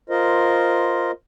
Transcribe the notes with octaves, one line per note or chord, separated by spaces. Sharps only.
F4 A#4 C5 D#5